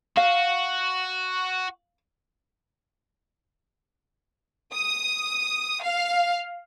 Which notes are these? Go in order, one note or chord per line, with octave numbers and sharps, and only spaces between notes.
F#4 F5
D#6
F5